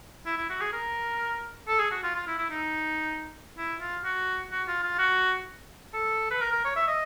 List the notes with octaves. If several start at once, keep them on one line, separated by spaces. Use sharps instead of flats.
E4
E4
F#4
G#4
A#4
A4
G#4
F#4
F4
F4
E4
E4
D#4
E4
F4
F#4
F#4
F4
F4
F#4
A4
B4
A#4
A#4
C#5
E5
D#5